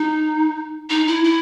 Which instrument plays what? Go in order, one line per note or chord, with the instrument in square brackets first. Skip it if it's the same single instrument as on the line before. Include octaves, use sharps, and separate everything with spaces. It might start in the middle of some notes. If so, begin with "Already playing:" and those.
Already playing: [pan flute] D#4
D#4
E4
E4